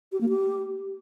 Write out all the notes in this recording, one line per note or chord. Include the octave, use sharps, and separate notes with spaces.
G4
A#3
G4